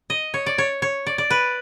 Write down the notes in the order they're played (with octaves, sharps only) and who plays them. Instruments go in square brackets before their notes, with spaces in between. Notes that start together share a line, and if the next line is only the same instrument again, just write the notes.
[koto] D#5
C#5
D5
C#5
C#5
D5
D5
B4